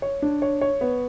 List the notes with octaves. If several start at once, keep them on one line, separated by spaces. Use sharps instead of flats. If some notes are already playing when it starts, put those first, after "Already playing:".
C#5
D4
C#5
C#5
B3